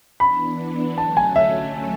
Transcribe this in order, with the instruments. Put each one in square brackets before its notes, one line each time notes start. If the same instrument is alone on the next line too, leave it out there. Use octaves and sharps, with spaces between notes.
[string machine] E3 B3 D4 [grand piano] B5
[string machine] D3 F#3 A3 C#4 [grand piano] A5
[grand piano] G#5
E5